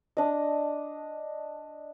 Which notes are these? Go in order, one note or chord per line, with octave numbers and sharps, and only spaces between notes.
D4 D#5